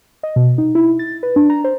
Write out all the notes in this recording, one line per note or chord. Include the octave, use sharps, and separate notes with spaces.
D#5
B2
D#4
E4
A6
B4
D4
A#5
C5